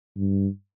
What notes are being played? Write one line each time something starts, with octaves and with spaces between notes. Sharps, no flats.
G2